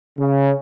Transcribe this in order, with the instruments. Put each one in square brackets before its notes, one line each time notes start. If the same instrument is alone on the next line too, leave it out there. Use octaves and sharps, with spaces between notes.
[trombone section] C#3